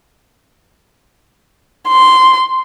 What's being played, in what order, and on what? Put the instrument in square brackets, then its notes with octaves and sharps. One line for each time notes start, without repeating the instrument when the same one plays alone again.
[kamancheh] C6